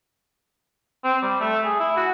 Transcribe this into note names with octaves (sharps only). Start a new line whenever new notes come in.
C4
G3
A3
G#4
E4
F#4